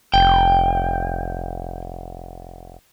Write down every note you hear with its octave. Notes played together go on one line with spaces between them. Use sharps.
F1 G5